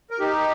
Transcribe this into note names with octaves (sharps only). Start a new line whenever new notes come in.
A#4
D#4 G4